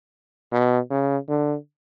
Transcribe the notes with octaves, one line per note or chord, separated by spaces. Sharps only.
B2
C#3
D3